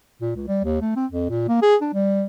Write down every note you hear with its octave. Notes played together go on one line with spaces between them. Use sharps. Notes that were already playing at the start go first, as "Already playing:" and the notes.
A#2
C#2
G3
D#2
A3
C4
F2
A#2
A#3
G#4
D4
G3